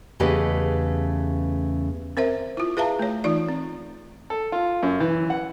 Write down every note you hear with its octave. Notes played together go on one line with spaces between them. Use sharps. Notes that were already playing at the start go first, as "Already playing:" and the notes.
E2 C#3 A3 G4 B4 D#5
C4 A#4 C5 E5
E4 F4
G#4 B4 E5 F5 A5 A#5
A3 C#5
E3 D#4 F4 D5
C4
A4
F4
F#2
E3
F#5